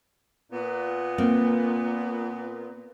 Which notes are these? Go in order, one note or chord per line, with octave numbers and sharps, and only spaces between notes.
A#2 B3
A#3 C4